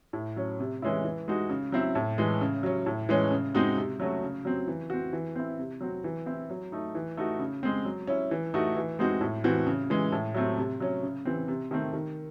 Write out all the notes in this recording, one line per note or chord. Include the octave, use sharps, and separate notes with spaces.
A2
F#3 C#4
C3
E3 G#3 C#4 E4
E3
G#3 D#4 F#4
C#3
F#3 C4 E4
A2
E3 G#3
C#3
F#3 C#4
A2
E3 G#3 C#4
C#3
G#3 C4 D#4 F#4
C3
F#3 A3 C#4 F#4
C#3
F#3 C4
E3
C4 F#4
E3
C4 E4
C3
F#3 C4 F#4
E3
C4 E4
F#3
A3 D#4
E3
A3 D#4 F#4
C#3
G#3 C4
F#3
C#4 E4
E3
A3 D#4 F#4
E3
G#3 C4 D#4 F#4
A2
E3 C4 F#4
C#3
E3 G#3
A2
F#3 A3 C4
C3
F#3 C#4
C#3
E3 C4
C3
D#3 A3 C4
D#3